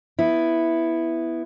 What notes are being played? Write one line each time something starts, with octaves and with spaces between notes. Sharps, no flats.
B3 E4